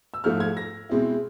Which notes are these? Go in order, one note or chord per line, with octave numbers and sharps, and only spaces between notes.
E6
G#2 F3 A3 F6
G#6
A#6
B2 G#3 C4 E4